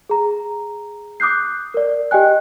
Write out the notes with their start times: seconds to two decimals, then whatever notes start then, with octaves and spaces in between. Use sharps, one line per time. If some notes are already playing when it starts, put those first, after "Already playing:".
0.09 G#4 A#5
1.20 D6 D#6 F#6 G6 C7
1.74 A#4 D5
2.11 G4 D#5 G5 G#5 F#6